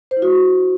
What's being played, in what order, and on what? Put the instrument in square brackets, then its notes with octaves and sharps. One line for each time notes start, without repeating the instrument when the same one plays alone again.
[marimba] C5
E4
F#4